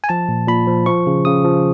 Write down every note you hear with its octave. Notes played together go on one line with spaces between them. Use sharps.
G#5
F3 A5
A#2
A#2 B5
F3
F3 C#6
C#3
C#3 D#6
F3